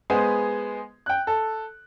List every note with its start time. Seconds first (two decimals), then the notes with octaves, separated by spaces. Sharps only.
0.10 G#3 B3 G#4 C5
1.06 G5 F#6
1.27 A4